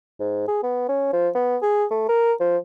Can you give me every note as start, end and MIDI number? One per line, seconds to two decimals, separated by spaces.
0.20 0.46 44
0.48 0.58 68
0.63 0.88 59
0.89 1.08 61
1.13 1.29 53
1.35 1.57 59
1.62 1.85 68
1.91 2.09 57
2.09 2.33 70
2.40 2.57 53